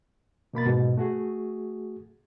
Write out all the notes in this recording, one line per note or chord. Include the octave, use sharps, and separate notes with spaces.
B2 A#3 B5 A6
G#2 B2
A3 F#4 G#4